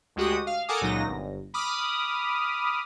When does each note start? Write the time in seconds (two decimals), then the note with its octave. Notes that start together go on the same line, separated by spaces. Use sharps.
0.16 D2 G#3 F#4 G4 D#6
0.47 F5
0.68 A4 A#4 F#5 G#5 D6 D#6
0.81 C#2 A#2 F#3 D#4 A#6
1.07 G1
1.54 B5 D6 D#6 F6